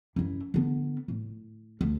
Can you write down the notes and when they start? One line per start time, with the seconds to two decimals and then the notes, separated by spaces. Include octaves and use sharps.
0.16 F#2 E4
0.54 D3 B3
1.08 A2
1.81 D2